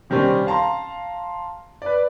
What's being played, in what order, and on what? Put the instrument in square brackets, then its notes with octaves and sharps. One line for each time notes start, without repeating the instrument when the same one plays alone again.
[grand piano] C3 D#3 G3 C4 C#4
F5 A5 A#5 C6
B4 D5